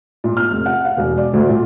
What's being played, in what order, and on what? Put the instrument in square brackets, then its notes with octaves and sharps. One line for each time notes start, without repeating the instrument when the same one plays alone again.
[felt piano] A#2
F6
F1
F#5
F5
E1
D5
D2
A#2